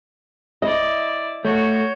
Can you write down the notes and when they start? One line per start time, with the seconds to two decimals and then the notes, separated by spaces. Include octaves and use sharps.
0.62 E4 D5 D#5
1.45 A3 F#4 C#5 G6